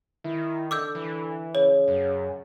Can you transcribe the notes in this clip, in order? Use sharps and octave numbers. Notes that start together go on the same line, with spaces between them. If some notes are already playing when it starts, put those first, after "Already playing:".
D#3 E4
D3 D6 E6 G6
E3
C#3 C#5
F#2